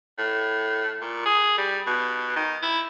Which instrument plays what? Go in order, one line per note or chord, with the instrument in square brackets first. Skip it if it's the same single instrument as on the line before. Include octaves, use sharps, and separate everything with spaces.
[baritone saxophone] A2
A#2
G#4
G3
B2
D#3
E4